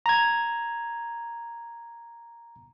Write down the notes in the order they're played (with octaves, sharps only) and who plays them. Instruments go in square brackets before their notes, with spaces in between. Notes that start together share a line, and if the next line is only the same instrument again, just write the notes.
[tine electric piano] A#5 G#6